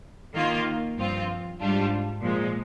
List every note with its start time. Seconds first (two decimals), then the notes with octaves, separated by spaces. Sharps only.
0.34 D#3 A#3 F4
0.97 G2 F3 C4 F4
1.60 G#2 G3 D4 F4
2.22 A#2 F3 G#3